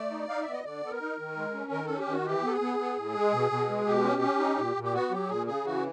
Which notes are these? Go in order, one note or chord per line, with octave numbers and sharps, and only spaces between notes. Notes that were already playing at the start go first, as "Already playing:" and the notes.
Already playing: A3 D5
D#4
D#4 F5
E5
B3
D#5
D3 D5
B3 A4
A#4
D#4
D#3
G#3
C#4
D#3 A#4
C#4 A4
G4
D#3 F#4
E3 G4
B3 A4
G#4
B3
B3
A2
G#3
B2
B2
G#3
B2 G4
C#4
C#4
D#4
A#2
A#2
G4
B3 F#4
F#3 G4
A#2 G#4
C#3 G#4
E3 F#4